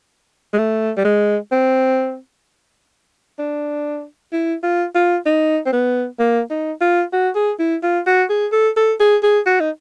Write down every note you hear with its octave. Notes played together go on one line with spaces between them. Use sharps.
G#3
A3
G3
G#3
C4
D4
E4
F4
F4
D#4
C4
B3
A#3
D#4
F4
F#4
G#4
E4
F4
F#4
G#4
A4
A4
G#4
G#4
F#4
D#4